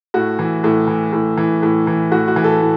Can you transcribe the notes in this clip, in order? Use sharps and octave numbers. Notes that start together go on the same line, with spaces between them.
A2 F#4
E3
A2
E3
A2
E3
A2
E3
A2 F#4
F#4
E3
A4
A2